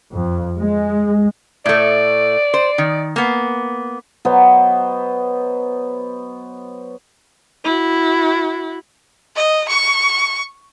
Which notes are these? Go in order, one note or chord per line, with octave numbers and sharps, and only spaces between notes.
F2
G#3
A2 A3 D5
C5
D#3
A#3 B3
F#3 B3 C5 D#5
E4 F#4
D#5
C#6